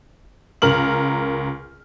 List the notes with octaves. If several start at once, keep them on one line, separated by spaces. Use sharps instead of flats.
C#2 A#4 F6 F#7